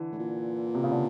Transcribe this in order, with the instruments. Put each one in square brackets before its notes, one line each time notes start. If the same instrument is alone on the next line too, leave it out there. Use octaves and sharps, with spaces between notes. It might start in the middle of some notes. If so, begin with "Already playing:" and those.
Already playing: [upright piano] D3 E3
[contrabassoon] A2
A#2
[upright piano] C3
C#3
D3